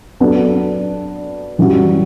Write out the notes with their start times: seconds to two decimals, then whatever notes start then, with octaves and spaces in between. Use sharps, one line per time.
0.20 F#3 B3 D4 A4
1.58 F#2 E3 G3 C#4 F#4